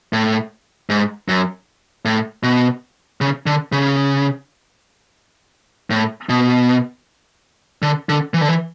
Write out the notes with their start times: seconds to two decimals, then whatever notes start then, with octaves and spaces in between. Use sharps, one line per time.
0.13 A2
0.90 G#2
1.28 F#2
2.05 A2
2.43 B2
3.21 C#3
3.46 D3
3.72 C#3
5.90 A2
6.29 B2
7.82 D3
8.09 D3
8.34 E3
8.41 D3
8.48 E3